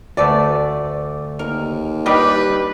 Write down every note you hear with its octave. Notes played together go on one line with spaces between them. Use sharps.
D2 A3 A4 B4 D5
D#2 A#4
G3 D4 D#4 G4 B4 D5 D#5